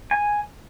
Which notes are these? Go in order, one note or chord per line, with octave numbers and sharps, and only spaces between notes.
G#5